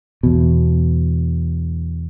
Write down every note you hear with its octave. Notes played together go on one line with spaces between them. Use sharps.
E2 B2